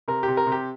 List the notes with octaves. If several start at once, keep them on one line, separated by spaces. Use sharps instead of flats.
C3 A#4
C3 G4
A#4
C3
G4